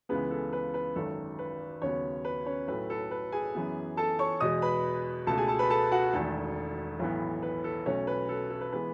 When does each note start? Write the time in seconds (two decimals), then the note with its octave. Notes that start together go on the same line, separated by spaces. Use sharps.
0.09 C#2 C#3 E3 G#3 B3 B4
0.31 A4
0.53 B4
0.74 B4
0.96 G#1 F#2 D#3 A4
1.39 B4
1.82 D#2 C#3 F#3 B3 C#4 C#5
2.25 B4
2.46 C#4 C#5
2.68 B1 A2 F#3 A3 B4
2.90 A4
3.11 B4
3.32 G#4 G#5
3.55 F#2 E3 B3
3.97 A4 A5
4.19 C#5 C#6
4.40 E2 B2 G#3 D#5 D#6
4.62 B4 B5
5.27 C#2 B2 A3 A4 A5
5.38 G#4 G#5
5.48 A4 A5
5.59 B4 B5
5.70 A4 A5
5.91 F#4 F#5
6.13 E1 E2 D#3 A3 A4
7.00 B1 A2 E3 B3
7.42 B4
7.64 A4
7.86 B1 B2 A3 C#4 C#5
8.07 B4
8.29 A4
8.50 A4
8.61 B4
8.72 E3 G#3 B3 B4